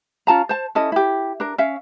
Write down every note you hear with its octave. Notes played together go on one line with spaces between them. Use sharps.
C#4 F4 A5 A#5
C5 A5
C#4 E4 A4 D#5
E4 G4
D4 A#4
C#4 E5 F5